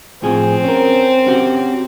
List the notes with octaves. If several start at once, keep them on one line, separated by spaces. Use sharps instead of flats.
A2 F3 C4 G#4
C#4 A#4
C#4 F#4 G4